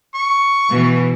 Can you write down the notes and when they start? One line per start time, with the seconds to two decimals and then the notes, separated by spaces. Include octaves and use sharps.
0.14 C#6
0.69 B2 E3